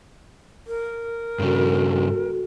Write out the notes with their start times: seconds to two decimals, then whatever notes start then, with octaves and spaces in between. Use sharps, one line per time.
0.67 A#4
1.39 G2 C#3 F#4 A4